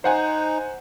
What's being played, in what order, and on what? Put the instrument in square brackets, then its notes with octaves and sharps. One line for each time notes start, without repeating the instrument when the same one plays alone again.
[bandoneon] D#4 [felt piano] C5 F#5 G#5